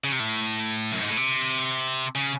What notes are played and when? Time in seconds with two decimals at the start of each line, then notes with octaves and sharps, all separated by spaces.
0.04 C#3
0.12 C3
0.20 A2
0.92 F#2
1.01 G#2
1.09 A2
1.17 C3
2.15 C#3